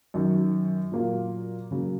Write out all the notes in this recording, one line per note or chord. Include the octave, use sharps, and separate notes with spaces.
F#2 D#3 F#3
A#2 F#3 A#3 F4
C#3 F#3 A#3